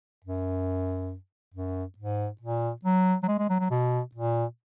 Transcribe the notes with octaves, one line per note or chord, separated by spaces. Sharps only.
F#2
F#2
G#2
A#2
F#3
F#3
G#3
G#3
F#3
F#3
B2
A#2